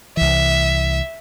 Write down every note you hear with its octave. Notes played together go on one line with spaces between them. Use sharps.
C2 E3 E5